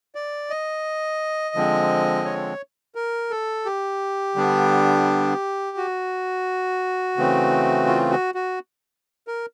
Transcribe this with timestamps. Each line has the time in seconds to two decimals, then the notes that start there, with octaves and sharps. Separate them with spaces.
0.15 D5
0.50 D#5
1.55 D3 F3 G#3 C4
2.25 C#5
2.95 A#4
3.31 A4
3.65 G4
4.35 D3 G3 B3 D4
5.77 F#4
7.17 C#3 E3 A3 C4
7.87 F4
8.10 F#4
8.35 F#4
9.28 A#4